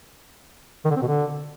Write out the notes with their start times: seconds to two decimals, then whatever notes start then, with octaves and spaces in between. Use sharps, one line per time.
0.85 D#3
0.91 D3
0.96 C4
1.02 B2
1.07 D3